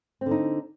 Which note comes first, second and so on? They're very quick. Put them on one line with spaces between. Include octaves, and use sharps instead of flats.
C4 D3 D#4